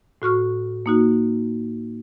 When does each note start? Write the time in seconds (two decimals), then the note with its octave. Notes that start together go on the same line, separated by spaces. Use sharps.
0.22 A2 F#4 C#6 F6
0.86 A#3 D#4 F#4